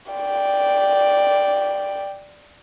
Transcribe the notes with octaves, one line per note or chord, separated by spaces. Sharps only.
D5 G5